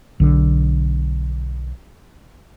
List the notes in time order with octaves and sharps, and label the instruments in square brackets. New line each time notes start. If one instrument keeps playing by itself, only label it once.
[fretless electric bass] B1 D3